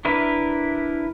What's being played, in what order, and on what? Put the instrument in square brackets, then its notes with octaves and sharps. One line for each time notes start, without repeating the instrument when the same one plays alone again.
[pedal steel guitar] D4 E4 A#4 B4